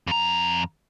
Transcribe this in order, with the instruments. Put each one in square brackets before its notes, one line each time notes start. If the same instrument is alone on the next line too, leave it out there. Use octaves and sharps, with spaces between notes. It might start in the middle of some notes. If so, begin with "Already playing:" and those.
[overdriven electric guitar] F2 A#5